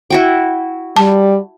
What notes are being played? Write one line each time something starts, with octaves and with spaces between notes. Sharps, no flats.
E4 F#4 G5
G3 A5